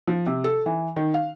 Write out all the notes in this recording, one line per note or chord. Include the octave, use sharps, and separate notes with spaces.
F3
C3
A4
E3
D#3
F5